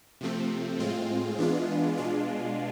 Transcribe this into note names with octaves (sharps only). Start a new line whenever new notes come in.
C3 F3 A3 C4
A2 G#3 C4 F4
E3 G#3 B3 D4 F4
B2 G#3 D4 F4